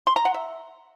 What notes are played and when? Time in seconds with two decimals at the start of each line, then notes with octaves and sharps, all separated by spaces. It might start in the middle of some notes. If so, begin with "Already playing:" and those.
0.07 C6
0.16 A#5
0.25 F#5
0.34 E5